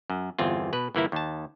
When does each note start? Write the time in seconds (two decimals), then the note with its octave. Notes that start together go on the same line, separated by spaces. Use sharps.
0.10 F#2
0.39 G1 E2 C4 F4
0.73 B2 B4
0.95 G1 E3 A#3 E4
1.12 D#2 A5